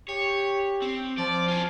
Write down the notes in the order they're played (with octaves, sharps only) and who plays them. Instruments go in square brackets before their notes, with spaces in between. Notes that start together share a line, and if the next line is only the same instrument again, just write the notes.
[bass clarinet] G4 [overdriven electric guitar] C#5
[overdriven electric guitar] C4
[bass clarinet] F3 [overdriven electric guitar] D5
[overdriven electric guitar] F4 G#4